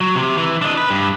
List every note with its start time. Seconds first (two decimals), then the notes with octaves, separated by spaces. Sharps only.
0.01 F#3
0.15 C3
0.37 E3
0.62 D4 D#5
0.77 B4
0.90 G2